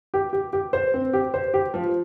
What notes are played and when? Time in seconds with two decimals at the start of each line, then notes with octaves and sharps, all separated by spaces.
0.14 G4
0.33 G4
0.53 G4
0.73 C5
0.94 C4
1.13 G4
1.34 C5
1.54 G4
1.74 F3